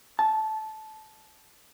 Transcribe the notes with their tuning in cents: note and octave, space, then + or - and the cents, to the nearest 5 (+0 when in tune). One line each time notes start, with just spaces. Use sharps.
A5 -15